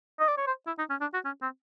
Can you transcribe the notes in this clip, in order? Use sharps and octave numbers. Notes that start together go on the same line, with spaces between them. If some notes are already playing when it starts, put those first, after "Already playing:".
D#5
D5
C#5
C5
E4
D#4
C#4
D4
F#4
C#4
C4